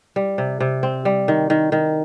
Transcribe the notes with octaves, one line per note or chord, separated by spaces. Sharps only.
G3
C3
C3
C4
G3
D#3
D#3
D#3